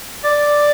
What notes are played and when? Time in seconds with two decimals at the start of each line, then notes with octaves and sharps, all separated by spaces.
0.24 D5